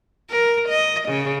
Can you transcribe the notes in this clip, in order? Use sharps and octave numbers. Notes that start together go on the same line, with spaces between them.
A#4
D#5
C#3